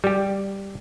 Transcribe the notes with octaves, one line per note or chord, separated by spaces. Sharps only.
G3 G4